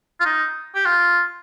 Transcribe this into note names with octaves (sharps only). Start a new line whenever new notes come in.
F4
D#4
G4
F4